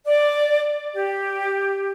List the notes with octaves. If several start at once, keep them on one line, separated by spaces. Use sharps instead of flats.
D5
G4